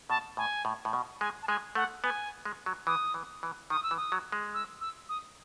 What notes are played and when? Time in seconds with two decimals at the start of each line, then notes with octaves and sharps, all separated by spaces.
0.09 B2 A5
0.37 A2 G#5
0.65 A2
0.85 A2
0.93 B2
1.21 G#3 G#5
1.43 A5
1.48 G#3 G#5
1.75 A3 F#5
2.04 B3 G#5
2.45 G#3
2.66 F#3
2.87 E3 D#6
3.14 E3
3.43 E3
3.70 D#3 D#6
3.83 E6
3.91 E3
3.97 D#6
4.12 F#3
4.32 G#3
4.54 E6
4.81 E6
5.09 D#6